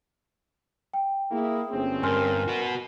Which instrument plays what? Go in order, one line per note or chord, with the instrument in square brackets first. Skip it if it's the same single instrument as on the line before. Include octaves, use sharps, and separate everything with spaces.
[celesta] G5
[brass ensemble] A#3 E4 [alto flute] G#4
[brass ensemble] G1 C4 C#4
[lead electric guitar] G2 [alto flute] A#4 [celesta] G#5 C6 F6
[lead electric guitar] F#4 B4